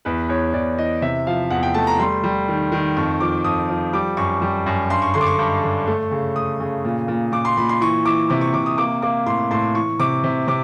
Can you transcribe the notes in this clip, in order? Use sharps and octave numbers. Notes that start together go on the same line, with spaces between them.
E2 B4
E2 C#5
E2 D5
E3 D#5
C3 E5
F3 F5
E2 F#5
G5
A3 A5
A#5
G3 C6
G3
D#3
D#3
F2 C#6
F3 D6
F2 D#6
F3
G3 D6
F#2 C#6
G3
F#2
G2 C6
C#6
D3 C6
D6
C#6
G2
D3
A3
C#3
A3 D#6
C#3
A#2
A#2
A#2 D6
C6
A#2 B5
C6
E3 C#6
E3 D6
C3 D6
C#6
C3 D6
D#6
A#3 D6
A#3 D6
A2 C6
A2 C6
E3 C#6
C3 D6
C3
C3 D6